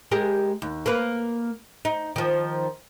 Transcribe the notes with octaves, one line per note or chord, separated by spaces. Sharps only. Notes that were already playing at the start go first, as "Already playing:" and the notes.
G#3 G4 A#4
D#2
A#3 B4
D#4
D#3 F3